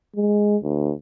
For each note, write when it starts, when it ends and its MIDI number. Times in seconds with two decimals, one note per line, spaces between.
0.16 0.57 56
0.63 0.93 38